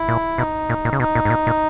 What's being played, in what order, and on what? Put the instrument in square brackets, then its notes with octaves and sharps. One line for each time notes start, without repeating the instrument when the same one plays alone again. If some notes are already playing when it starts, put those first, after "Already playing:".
Already playing: [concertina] E4
[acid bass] A#2
[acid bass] B2 [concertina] D#4
[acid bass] A#2
A#2
C#3
[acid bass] B2 [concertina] D#4
[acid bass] A#2
G#2
A#2
A#2